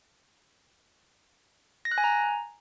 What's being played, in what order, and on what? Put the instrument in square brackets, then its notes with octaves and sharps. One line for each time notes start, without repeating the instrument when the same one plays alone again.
[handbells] A#6
F#6
G#5
A#5